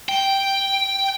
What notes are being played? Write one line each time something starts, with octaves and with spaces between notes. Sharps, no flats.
G5